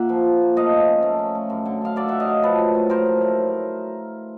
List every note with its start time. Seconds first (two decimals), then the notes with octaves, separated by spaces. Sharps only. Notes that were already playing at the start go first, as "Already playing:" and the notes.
Already playing: A#2 A#3 E5 F#5
0.09 F3
0.25 F3
0.42 A#3
0.56 A3 D#5 F5
0.72 G#2
0.87 C#4
1.03 A3
1.19 C#4
1.35 A3
1.50 F#2
1.65 D3
1.82 F#2 F5
1.96 F#3 D5 E5
2.08 F#3 E5 F#5
2.20 D#5 F5
2.28 F#3
2.43 F3 A4 B4
2.60 A2
2.75 A2
2.90 A3 A#4 C5
3.06 A3
3.21 A3